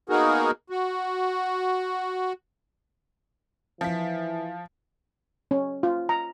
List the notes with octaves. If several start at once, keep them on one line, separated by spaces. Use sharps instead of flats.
A#3 B3 D#4 F#4 G#4 A#4
F#4
E3 F3 B6
C#4
F4
A#5